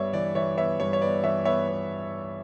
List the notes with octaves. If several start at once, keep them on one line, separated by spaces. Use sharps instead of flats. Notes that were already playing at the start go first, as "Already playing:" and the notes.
Already playing: G2 B3 C#5 D5 E5
E3 D5
E3 C#5 E5
B3 C#5 E5
G2 C#5
C#5
B3 D5
E3 C#5 E5
B3 C#5 E5
B3